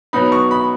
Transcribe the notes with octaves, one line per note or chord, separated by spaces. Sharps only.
B2 F#3 B3 D#4 B5
C#6
B5